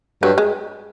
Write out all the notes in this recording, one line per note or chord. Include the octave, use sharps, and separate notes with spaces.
G2 F#3
G#3